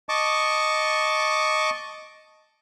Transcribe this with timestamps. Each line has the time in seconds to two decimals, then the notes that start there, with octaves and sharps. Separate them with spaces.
0.09 D#5 A5 C#6 D6